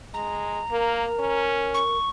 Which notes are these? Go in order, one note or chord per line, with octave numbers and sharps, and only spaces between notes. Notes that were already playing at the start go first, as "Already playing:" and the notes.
G#3 A#5
A#3 A#4
C#4
C#6